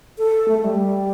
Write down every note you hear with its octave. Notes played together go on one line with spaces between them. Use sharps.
A4
A3
G3